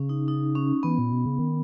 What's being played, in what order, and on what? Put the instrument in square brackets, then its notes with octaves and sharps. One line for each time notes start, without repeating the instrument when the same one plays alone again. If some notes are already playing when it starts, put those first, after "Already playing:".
Already playing: [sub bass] C#3 [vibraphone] C#4
[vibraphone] D#4
D#4
C#4
[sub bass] E3 [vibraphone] B3
[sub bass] A#2
B2
C#3
D#3